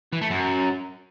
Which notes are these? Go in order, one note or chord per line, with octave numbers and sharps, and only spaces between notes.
E3
A3
F#2